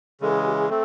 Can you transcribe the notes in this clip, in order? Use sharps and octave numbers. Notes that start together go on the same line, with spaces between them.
C#3 E3 G#3 A4
G#4
G4
G#4
A3 C4 A4